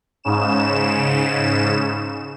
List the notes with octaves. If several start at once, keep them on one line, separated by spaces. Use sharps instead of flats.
G#2 C#3 E7